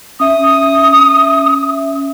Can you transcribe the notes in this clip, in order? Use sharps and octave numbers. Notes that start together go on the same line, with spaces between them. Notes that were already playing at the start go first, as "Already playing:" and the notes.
C#4 E5 D#6